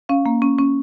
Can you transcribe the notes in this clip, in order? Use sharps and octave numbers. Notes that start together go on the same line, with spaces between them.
C#4 F5
A#3
C#4
C#4